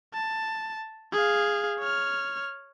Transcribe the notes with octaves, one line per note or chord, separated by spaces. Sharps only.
A5
G#4 F5
C#5 F6